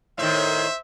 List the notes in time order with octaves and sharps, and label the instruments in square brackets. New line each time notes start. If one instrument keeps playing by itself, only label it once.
[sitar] A2 D#3 [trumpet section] C5 E5